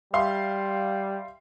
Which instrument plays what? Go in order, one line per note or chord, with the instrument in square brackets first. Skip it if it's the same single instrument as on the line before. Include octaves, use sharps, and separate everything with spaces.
[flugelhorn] G3 [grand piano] E5 F5 C6